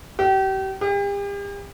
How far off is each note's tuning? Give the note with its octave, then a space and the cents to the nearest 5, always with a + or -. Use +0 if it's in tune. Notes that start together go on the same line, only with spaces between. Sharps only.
G4 -35
G4 +40